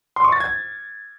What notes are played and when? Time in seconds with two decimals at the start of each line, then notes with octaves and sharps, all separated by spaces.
0.16 C6
0.24 C#6
0.32 A6
0.40 G#6